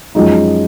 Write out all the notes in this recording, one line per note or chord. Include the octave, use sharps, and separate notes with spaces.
F#2 F3 G#3 D#4